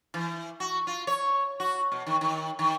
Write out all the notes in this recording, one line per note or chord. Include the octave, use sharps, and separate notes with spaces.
E3
F#4
F4
C#5
F#4
B2
D#3
D#3
D#3